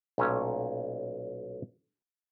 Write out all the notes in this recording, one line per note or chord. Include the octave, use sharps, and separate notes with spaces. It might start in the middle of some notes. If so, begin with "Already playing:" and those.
B1 A#2 A3 C#4